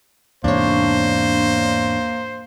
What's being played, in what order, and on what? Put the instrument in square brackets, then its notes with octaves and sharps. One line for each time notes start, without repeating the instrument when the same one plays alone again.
[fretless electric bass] E2 G#2 C3 [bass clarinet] A#3 [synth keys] D4 C#5 [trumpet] C5